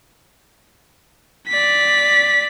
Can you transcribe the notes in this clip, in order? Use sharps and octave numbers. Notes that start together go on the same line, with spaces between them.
D5 B6